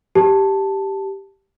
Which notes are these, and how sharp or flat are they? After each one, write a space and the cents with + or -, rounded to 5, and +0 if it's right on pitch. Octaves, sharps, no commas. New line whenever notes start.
G4 -5 A5 +0